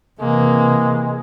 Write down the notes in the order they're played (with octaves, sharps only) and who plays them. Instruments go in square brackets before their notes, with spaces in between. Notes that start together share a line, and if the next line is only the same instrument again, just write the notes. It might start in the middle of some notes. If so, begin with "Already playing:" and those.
[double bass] C3 E3 [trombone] G#3 [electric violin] A#3